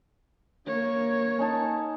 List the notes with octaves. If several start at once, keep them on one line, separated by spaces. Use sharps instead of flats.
A#3 C#5
C#4 D#4 A5